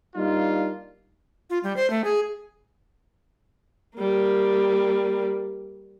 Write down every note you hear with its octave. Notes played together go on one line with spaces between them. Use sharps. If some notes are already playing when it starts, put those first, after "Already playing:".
G3 A#3 D4 D#4 F4
F4
G3
C5
A3
G#4
G3 A#3